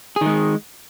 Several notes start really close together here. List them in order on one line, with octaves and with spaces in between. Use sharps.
G#4 D#3 G#3